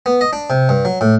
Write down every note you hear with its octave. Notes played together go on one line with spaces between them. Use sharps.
B3
D#5
D4
C3
G2
F#3
A2